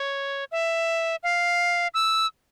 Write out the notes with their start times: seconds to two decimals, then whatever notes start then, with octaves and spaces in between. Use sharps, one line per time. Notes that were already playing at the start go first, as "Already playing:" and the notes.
Already playing: C#5
0.52 E5
1.23 F5
1.94 E6